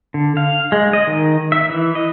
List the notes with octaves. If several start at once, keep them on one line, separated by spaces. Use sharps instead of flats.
D3
F5
G#3
D#5
D#3
E5
E3
D#5